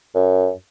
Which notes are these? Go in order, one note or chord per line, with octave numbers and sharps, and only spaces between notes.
F#2